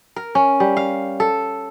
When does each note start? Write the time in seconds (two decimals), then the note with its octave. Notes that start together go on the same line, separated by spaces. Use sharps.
0.16 A#4
0.35 C#4
0.60 G3
0.77 F5
1.20 A4